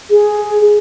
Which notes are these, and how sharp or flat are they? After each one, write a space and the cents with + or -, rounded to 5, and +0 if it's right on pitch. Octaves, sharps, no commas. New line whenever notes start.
G#4 +5